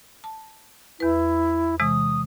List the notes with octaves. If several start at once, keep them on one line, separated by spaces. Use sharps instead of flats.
A5
E2 E4 B4
C3 E3 G#3 D#6